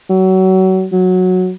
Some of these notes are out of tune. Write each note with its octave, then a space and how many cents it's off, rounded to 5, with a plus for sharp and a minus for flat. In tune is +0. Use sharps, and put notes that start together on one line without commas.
F#3 +30
F#3 -10